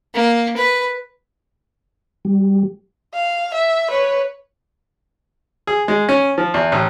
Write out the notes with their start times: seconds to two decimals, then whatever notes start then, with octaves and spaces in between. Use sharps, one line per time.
0.14 A#3
0.57 B4
2.25 G3
3.14 F5
3.54 E5
3.91 B4 C#5
5.67 G#4
5.88 G#3
6.09 C#4
6.38 F3
6.54 E2
6.72 A1